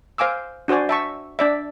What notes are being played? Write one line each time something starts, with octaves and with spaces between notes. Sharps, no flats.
C5 F5 G#5 D6 E6
D4 F#4 C5 D5 G#5
E5 A5 C#6
D4 D5 E5